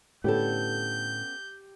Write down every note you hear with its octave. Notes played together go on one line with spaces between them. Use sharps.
A2 D3 B3 C#4 G4 A4 G6